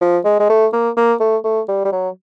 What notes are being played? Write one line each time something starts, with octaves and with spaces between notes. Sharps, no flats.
F3
G#3
G#3
A3
A#3
A#3
A3
A3
G3
G3
F#3